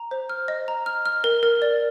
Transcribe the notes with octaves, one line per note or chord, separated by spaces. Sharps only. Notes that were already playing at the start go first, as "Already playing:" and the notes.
Already playing: A#5
C5
F6
D#5
A#5
F6
F6
A#4
A#4
D5